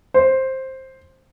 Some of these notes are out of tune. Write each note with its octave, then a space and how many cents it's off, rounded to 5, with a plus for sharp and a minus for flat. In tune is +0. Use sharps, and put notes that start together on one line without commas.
C5 +10